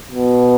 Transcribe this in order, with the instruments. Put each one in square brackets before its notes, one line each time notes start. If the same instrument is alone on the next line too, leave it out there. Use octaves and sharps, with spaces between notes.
[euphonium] B2